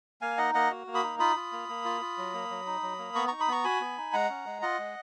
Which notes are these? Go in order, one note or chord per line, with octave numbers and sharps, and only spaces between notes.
A#3 F5 G#5
D#4 D#5 F#5
A#3 D#5 F#5
F#4
A#3
B5 D#6
D#4
F4 B5 D#6
F4
A#3
A#3
F4
F4
F#3
A#3
F#3
D#4
F#3
A#3
B3 A#5 C#6
D#4 A#5 C#6
B5 D#6
B3 A#5 C#6
F#4 G#5 B5
B3
D#4
G#3 F#5 A#5
C#4
G#3
F4 D#5 F#5
G#3